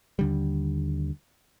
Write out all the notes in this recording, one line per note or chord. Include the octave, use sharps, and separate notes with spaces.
D#2 D3 G3